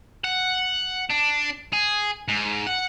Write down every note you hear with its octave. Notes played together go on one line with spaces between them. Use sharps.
F#5
D4
G#4
G#2
F#5